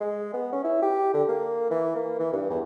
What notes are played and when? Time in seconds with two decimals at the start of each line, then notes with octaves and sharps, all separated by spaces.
0.01 G#3
0.34 B3
0.53 C#4
0.64 E4
0.82 G4
1.13 D3
1.29 A#3
1.71 E3
1.95 A#3
2.19 E3
2.32 G2
2.50 E2